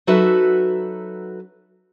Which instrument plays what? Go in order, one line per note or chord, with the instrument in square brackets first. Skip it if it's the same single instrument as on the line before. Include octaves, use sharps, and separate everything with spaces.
[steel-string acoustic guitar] F#3 D#4 F#4 A4 B4 E5